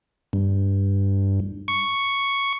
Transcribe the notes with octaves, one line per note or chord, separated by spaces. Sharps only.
G2
C#6